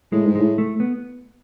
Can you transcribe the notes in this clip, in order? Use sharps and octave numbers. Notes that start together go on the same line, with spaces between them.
A2 G#3
G#2
A2 G#3
A3
B3